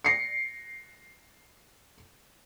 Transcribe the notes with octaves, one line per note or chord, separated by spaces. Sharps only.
A#6 C7 C#7